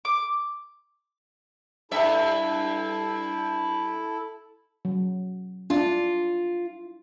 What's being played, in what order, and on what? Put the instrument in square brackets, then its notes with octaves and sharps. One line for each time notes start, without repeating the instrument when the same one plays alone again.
[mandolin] D6
[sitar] G2 E5 [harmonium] E4 A4
[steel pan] F#3
[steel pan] D4 [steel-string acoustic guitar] F4